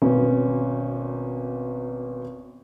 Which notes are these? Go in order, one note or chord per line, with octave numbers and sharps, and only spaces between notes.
G#1 B2 C#4